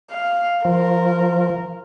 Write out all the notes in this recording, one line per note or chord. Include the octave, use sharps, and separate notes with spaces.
F5
F3 A#4